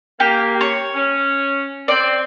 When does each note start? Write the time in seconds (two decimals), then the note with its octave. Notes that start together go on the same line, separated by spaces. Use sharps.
0.20 A#3 G4
0.61 C#5
0.94 C#4
1.88 C4 D5